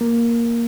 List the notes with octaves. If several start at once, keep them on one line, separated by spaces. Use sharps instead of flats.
A#3